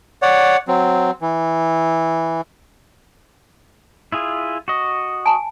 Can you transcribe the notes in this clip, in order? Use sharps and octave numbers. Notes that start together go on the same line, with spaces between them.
C#5 D5 F#5
F#3 C4
E3
E4 F4 G#4
F#4 D#5
G#5 A5